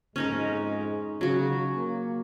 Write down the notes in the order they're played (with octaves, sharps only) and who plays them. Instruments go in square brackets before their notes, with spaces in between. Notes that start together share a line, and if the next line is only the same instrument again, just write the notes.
[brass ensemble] F2 G#2 G#3 [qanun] C#4 D#4 A#4
[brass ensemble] C#3 [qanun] F#3 F#4
[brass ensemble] A#3